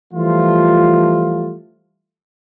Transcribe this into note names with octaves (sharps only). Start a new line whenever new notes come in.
E3 F3 G3 A3 F4